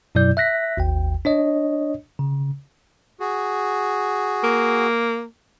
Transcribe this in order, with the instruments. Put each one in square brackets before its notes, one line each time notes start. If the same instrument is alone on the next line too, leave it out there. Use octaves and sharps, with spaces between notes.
[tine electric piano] F#2 B2 F#3 E4 D5 G6
E5 F#6 A#6 B6
G#1 D#2 G5
D4 C#5 D#5
C#3
[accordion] F#4 G#4
[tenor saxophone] A#3